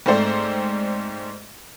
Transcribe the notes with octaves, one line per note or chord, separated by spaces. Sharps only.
G#2 A3 C4 A4 C5 D5